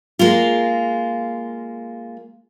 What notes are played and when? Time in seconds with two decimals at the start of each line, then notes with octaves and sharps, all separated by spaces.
0.19 G#3 A#3 F4